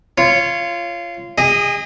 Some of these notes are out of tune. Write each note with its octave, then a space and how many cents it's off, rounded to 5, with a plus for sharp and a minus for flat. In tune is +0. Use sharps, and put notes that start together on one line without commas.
F4 -20 C#5 +0
G#4 -35 D#5 +0